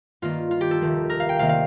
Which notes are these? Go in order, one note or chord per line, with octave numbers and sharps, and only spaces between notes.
G2 D#3 A#3 F4
F4
G4
A4
F1 D#2 D#3
A#4
F5
G5
D2 C3 D#3 A#3 F5
F5